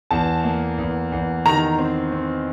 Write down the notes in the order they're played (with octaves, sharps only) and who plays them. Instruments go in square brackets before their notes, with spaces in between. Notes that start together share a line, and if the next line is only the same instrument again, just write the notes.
[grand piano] E2 [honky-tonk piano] A5
[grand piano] A#3
E2
E2
[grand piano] D#3 [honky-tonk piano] A#5
[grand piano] C4
C4